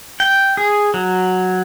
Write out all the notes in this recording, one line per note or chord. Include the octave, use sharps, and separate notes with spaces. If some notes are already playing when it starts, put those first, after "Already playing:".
G5
G#4
F#3